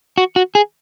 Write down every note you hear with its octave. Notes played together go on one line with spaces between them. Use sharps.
F#4
F#4
G#4